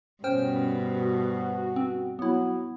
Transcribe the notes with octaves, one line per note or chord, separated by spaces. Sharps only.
G2 B2 C#4 C5 G5 F6
F#4
C4
F#3 B3 E4 F#4